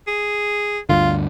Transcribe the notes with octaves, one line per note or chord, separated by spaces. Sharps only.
G#4
D2 G2 D3 F4